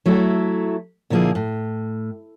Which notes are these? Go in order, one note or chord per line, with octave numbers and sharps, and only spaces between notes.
F#3 A3 E4 A4
A#2 D3 F3 A#3 E4 G#4
A2